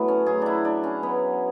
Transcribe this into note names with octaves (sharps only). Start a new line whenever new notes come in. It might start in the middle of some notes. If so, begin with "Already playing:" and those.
Already playing: A2 F#3 A3 B3
C#4
A2 F#3 G#4
D4 E4
D4
C#4
B2 F#3 B3